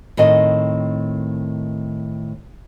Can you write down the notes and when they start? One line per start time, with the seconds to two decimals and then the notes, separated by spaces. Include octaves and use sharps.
0.17 A2 D#3 C4 D#5